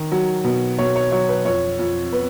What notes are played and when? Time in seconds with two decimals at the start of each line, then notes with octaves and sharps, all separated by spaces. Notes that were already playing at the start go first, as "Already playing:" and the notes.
Already playing: D#3
0.12 F#3
0.44 B2
0.78 B2 C#5
0.96 C#5
1.12 F#3 C#5
1.29 B4
1.45 F2 C#5
1.79 F2
2.12 B3 B4